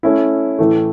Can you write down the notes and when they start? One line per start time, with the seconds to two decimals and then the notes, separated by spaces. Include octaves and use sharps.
0.03 A3 C#4 E4
0.59 A2 E3 A3